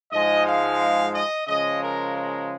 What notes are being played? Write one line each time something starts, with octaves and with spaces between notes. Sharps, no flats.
G#2 F3 G#3 D#5
F5
D#5
C#3 F3 G#3 D#5
A#4
A#4